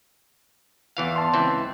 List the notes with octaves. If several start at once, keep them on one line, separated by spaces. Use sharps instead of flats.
E2 E3 F5
A5 C6
C#2 E3 C4